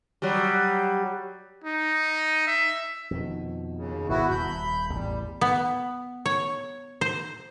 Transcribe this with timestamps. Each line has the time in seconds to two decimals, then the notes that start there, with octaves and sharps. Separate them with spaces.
0.22 F#3 G3
1.64 D#4
2.47 E5
3.11 F2 B2 D#3
3.77 D#2 C#3
4.09 G#1 B2 B3 E4 F#4
4.31 D#1 B5 G6
4.93 A1 E2 G3
5.41 B3
6.26 C#5
7.01 C5